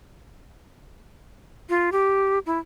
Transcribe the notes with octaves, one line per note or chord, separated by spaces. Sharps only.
F4
G4
E4